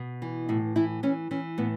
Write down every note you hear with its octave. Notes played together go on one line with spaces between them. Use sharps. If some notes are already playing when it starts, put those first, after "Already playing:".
Already playing: B2
E3
A2 E4
E3 E4
E3 C#4
E3 C#4
A2 B3